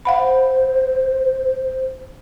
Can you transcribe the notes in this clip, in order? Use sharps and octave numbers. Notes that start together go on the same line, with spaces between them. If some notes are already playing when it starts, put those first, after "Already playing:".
C5 F5 F#5 B5